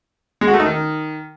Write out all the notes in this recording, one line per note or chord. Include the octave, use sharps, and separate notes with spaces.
G#3
F#4
A3
D#4
D#3